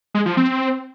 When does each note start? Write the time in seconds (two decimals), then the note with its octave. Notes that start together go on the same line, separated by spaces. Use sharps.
0.14 G#3
0.26 F3
0.37 C4